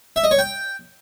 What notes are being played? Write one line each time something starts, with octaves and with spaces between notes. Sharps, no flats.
E5
D#5
C#5
G5